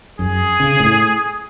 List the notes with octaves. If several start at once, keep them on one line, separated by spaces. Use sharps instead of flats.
F#2 G#4
C#3
A2